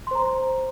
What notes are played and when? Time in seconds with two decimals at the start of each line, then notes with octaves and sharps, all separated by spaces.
0.07 C6
0.11 C5
0.15 A#5